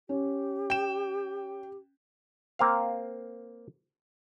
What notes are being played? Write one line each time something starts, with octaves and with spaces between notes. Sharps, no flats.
C#4 G4
G5 E7
A#3 C4 F5